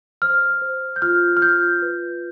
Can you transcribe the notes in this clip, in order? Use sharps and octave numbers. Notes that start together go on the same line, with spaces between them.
C5 F6
C5
G6
F4 F6
F6
F4 G6
B4